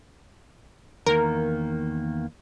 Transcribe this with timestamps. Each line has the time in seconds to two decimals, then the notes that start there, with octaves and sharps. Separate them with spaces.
1.06 E2 D#3 A#3 A#4